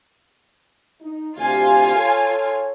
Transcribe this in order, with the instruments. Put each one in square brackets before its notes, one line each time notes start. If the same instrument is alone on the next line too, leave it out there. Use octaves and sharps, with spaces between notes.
[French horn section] D#4
[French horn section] D2 C3 G4 [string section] F4 G#5
[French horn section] A4 C#5